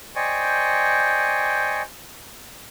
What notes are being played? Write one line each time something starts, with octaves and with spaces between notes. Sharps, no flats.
C5 D5 D#5 G5 G#5 C#6